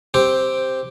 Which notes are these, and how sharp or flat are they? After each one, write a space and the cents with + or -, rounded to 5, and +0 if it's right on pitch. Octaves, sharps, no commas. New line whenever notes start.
C4 +0 G4 +0